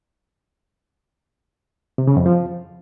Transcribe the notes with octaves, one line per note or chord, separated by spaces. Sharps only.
C3
C#3
F2
F3